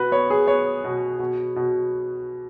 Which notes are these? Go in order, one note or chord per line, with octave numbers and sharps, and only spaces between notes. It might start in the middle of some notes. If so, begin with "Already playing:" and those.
Already playing: B2 F#4 B4
B3 C#5
G#4
B3 C#5
B2
B2
B2